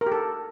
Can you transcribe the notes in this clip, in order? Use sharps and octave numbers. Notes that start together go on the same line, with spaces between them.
A#4
G4
A4